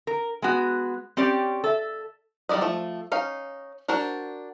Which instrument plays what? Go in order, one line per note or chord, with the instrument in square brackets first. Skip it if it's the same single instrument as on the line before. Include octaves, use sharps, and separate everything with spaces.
[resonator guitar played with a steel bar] A#4
G#3 B3 F#4
C4 C#4 G4 D5
A4 E5
[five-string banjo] D#3 G3 E4 D5 D#5
F3 A3
C#4 D#4 F5
D4 F#4 A#4 C5